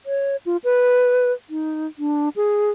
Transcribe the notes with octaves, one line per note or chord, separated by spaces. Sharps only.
C#5
F4
B4
D#4
D4
G#4